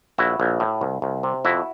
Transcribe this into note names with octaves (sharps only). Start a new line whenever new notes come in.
A#1 E4 F#4
A#1
A2
C2
C2
C3
F2 E4 F#4